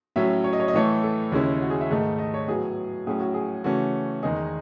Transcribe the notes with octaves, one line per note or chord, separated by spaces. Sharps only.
A2 F#3 C#4 E5
C#5
D#5
C#5
D#5
A2 E3 A3 C#5
A4
D#2 C#3 G#3 C#4 E4
F#4
G#4
E5
G#2 D#3 A3 D#4
D#5
C#5
A2 F#3 B3 G#4
A2 F#3 C#4 G#4
F#4
G#4
C#3 E3 A3 C#4 F#4
E2 D#3 G#3 D#4 G#4